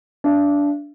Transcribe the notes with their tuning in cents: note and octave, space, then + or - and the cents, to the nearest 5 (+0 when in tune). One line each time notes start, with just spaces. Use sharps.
D4 -15 E5 +45